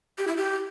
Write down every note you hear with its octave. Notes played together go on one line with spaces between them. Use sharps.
G4
E4
G4